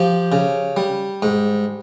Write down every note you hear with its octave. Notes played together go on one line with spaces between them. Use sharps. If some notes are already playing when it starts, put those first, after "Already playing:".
Already playing: F3 G4
C#3
G3
G#2